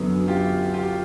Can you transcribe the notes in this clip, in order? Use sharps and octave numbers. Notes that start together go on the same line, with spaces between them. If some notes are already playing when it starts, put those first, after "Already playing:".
Already playing: F#2 D3 F#3 B3
F4 G4
F4 G4